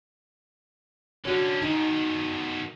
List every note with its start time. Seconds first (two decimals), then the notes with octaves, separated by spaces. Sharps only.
1.25 D3 C#4 F#4 C#5
1.62 B2 D#3 D#4